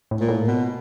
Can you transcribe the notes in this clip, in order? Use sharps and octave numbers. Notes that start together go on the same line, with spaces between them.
A2
A#2
A2
B2